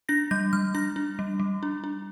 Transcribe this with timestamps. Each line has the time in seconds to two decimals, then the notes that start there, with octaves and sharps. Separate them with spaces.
0.09 D4 A#6
0.31 G3 G6
0.53 G3 F6
0.75 D4 A#6
0.96 D4
1.19 G3
1.40 G3
1.63 D4
1.84 D4